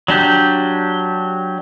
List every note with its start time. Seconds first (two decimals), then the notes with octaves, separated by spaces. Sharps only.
0.08 F#3 D4 G4 G6